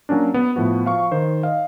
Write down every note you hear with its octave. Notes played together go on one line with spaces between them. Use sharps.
F#3 A#3 C#4 D4
B3
A2 F3 B3 F#4
F3 F5 C#6
D#3 C5
D#5 F5